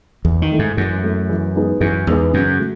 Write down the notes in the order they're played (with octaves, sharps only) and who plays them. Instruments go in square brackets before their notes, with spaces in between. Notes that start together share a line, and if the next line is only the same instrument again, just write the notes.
[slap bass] E2 [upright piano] E3
[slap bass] D#3
[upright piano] A3 E4 A4
[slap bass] G#2
[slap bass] F#2 [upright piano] E3
[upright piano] A3 E4 A4
E3
G#3 B3 D#4 G#4
[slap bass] F#2 [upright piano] E3
[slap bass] E2 [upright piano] G#3 B3 D#4 G#4
[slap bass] F#2 [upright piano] C#3
[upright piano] F#3 A3